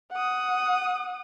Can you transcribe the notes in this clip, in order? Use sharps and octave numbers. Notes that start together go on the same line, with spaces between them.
F#5 D#6